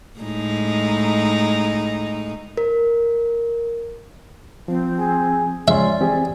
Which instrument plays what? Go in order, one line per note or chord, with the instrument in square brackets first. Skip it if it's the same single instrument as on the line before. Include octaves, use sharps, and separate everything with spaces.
[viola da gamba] A2 G#3 D#4
[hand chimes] A#4
[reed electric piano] F3 [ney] C4
[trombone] G#4
[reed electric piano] F3 G#3 C6 [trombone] C#4 [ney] D5 [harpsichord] E5
[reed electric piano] E3 C4 G4 [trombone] G#4